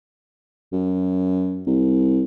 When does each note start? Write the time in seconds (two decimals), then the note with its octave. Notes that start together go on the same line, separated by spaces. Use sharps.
0.73 F#2
1.67 C2